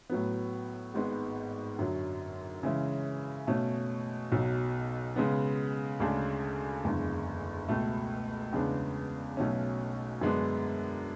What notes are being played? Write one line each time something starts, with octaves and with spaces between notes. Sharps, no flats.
A2 F#3 B3
G#1 G#2 G#3 B3
F#2 D3 F#3
C#3 E3 G#3 C#4 E4
B2 A3 C#4
B1 B2 F#3
C#3 G#3 B3
D2 C#3 G#3 D4 G#4
F#1 E2 D3 G#3
C#2 B2 A3
E2 C#3 G#3 B3 D4
B1 B2 A3 C#4
F#2 D3 G#3 B3 D4